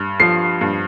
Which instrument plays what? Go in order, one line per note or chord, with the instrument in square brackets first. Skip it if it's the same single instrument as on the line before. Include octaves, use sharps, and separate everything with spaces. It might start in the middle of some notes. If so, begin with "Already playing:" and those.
Already playing: [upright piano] G2
F3 C7
G2